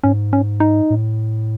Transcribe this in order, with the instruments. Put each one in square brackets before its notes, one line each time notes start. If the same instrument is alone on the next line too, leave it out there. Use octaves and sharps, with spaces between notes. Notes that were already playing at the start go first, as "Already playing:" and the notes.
[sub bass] G#2 [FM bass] C#4
[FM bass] C#4
D#4
[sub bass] A2